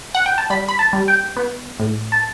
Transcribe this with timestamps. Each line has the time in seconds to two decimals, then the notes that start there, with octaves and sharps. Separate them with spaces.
0.15 F#5
0.26 G5
0.38 A5
0.50 G3 B5
0.69 B5
0.79 A5
0.93 G3
1.08 G5
1.37 B3
1.80 A2
2.12 A5